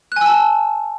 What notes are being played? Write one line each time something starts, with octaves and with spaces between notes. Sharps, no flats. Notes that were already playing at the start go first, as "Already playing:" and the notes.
G#5 A5 E6 F#6